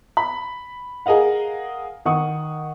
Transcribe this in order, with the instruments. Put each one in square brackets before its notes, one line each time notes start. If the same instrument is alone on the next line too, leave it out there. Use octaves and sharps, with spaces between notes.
[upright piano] B5
G#4 A#4 D#5 F5 F#5
D#3 F#5 C#6 D#6